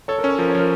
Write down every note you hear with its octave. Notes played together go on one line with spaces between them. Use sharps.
A4 C#5
A#4
C#4 C#5
F3 A#4
C#5
F3 A#4